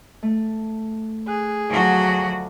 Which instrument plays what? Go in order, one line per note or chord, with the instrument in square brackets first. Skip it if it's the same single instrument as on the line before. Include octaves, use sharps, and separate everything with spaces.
[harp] A3
[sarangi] G#4 [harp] F#6
[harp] D2 F3 A5 [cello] F#3 F#4